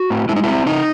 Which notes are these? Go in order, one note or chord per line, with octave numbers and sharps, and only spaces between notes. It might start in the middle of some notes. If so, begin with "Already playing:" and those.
Already playing: F#4
A2
G#3 E4
D#4
C4 E4
C#3 D#4